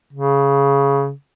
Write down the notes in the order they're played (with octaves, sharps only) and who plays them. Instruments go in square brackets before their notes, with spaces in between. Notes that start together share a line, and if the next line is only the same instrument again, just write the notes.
[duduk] C#3